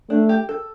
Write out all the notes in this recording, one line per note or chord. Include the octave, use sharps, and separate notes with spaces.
A3 D4
G4
A4